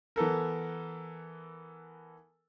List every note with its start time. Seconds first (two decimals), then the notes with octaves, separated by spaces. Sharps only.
0.16 E3 B3 A4 A#4